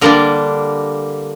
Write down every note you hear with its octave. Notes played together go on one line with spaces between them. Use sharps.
D3 G3 A#3 D4 A#4